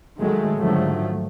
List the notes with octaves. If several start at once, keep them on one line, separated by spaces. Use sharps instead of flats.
D#3 F#3 G#3 A3
G#2 D3 D#3 F3 F#3 A3